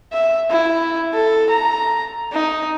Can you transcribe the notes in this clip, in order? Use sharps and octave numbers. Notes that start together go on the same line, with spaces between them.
E5
E4
A4
A#5
D#4